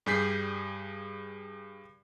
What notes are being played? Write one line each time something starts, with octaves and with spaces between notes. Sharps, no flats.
G2 G3 G#4 G6 B6 C7